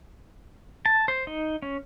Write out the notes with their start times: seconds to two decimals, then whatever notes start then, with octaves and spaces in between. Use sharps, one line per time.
0.86 A5
1.08 C5
1.27 D#4
1.62 C#4